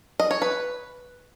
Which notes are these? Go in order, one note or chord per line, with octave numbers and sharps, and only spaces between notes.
D#5
C#5
B4